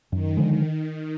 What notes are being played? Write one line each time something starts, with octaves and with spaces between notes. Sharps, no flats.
F#2 D#3
D3 F3 G#3